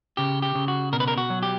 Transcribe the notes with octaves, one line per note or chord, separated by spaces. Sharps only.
C#3 G4
G4
C#3
F#4
B2 A#4
B4
A#4
F#4
F#3
G4